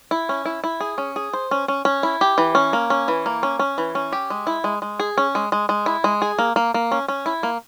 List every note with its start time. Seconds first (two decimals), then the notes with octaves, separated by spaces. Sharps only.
0.11 E4
0.29 C#4
0.45 E4
0.64 E4
0.80 G#4
0.98 C#4
1.16 G#4
1.33 C5
1.51 C#4
1.68 C#4
1.85 C#4
2.03 E4
2.21 G4
2.38 E3
2.55 C#4
2.73 A#3
2.90 C#4
3.08 E3
3.26 A#3
3.43 C#4
3.59 C#4
3.78 E3
3.95 C#4
4.12 G4
4.30 G#3
4.47 E4
4.64 G#3
4.82 G#3
5.00 G#4
5.18 C#4
5.35 G#3
5.52 G#3
5.69 G#3
5.86 E4
6.04 G#3
6.22 G#4
6.39 A#3
6.56 A#3
6.74 A#3
6.92 C#4
7.08 C#4
7.26 E4
7.43 A#3